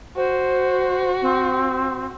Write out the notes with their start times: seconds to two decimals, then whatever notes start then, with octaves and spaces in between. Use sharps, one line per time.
0.17 F#4 C5
1.22 C4